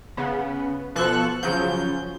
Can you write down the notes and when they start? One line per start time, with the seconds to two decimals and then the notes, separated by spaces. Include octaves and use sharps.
0.17 C#3 B3
0.95 B2 F3 A4 C#6 F#6
1.43 C#3 F3 F#3 G6